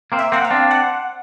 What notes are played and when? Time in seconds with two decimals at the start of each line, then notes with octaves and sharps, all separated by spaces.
0.12 A#3 C4
0.19 E5
0.32 A#3 C4 F#5
0.45 F5
0.50 C4 D4
0.71 F#5